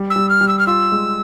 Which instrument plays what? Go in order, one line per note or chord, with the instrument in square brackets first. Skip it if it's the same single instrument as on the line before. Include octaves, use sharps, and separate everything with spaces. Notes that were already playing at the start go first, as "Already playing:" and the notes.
Already playing: [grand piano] G3
[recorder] E6
[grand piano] G3
[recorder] F6
[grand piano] G3
[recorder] E6
F6
[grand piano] F4 [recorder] E6
[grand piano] G#3